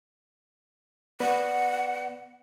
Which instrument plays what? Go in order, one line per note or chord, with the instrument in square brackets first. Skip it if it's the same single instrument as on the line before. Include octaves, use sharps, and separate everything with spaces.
[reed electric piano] B3 B4 D5 [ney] F#5